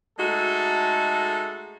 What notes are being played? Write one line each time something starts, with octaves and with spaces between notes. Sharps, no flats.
G#3 A3 D#4 F#4 A4